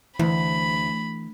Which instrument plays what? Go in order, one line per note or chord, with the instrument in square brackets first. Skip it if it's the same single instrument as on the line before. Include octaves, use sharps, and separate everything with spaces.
[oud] D2 [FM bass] E3 [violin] B5